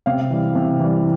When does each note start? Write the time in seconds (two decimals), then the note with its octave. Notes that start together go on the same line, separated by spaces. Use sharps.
0.06 C3 F5
0.30 E3 G3
0.55 C3
0.80 E3 G3